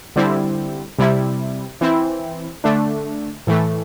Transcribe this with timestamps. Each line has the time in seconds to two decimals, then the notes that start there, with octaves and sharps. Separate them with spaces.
0.16 D3 G3 C4 E4
0.99 C3 G3 E4
1.81 E3 C4 E4
2.64 D3 A3 D4
3.47 A2 E3 A3